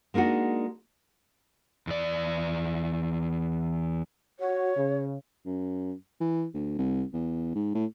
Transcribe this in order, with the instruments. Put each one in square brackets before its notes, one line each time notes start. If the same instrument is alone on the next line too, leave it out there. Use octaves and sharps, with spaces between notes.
[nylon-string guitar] G#3 A#3 D4 D#4 F#4
[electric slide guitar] E2 D5
[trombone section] F#4 [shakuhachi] C#5
[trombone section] C#3
[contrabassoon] F#2
E3
D2
C2
E2
G#2
A2